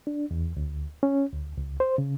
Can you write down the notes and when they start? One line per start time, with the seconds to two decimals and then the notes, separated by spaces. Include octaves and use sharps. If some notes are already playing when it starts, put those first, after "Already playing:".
0.07 D4
0.31 E2
0.57 D2
1.03 C#4
1.34 D2
1.58 C#2
1.80 C5
1.98 C#3